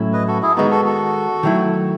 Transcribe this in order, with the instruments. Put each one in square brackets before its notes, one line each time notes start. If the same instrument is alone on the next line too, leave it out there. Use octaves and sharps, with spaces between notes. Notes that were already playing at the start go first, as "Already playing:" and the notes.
Already playing: [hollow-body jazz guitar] A2 F#3 A3 C#4 E4
[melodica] B4 D#5
F#4 A4
E4 G#4
[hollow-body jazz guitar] D#3 G#3 B3 [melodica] D#4 F#4
[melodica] F#4 A4
F#4 A4
[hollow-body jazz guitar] D#3 F#3 A3 E4